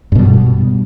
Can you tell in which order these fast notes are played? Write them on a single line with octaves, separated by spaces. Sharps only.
G2 B2 G3